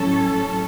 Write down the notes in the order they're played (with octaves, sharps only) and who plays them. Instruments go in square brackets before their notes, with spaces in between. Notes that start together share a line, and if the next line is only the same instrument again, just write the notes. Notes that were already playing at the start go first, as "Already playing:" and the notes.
Already playing: [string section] A2 F#3 C#4 A4